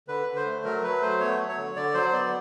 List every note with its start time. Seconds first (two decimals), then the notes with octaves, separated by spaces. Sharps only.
0.08 D3 B4
0.27 D3
0.36 C5
0.46 A3
0.64 F#3 A#4
0.83 F#3 B4
1.02 A3 C5
1.20 B3 C#5
1.38 F#3
1.49 C#5
1.57 D3
1.76 D3 D5
1.94 F#3 C5
2.12 B3 D5